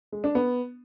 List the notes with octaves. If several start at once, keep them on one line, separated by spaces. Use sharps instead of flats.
G#3
D4
B3